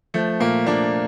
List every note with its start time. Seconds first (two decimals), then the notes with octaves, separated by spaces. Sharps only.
0.14 F3 A3
0.40 A#2 A#3
0.66 F3 A#3 D4